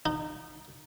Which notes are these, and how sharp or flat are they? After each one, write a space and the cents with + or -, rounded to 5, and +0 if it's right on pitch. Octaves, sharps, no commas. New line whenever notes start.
D#4 -20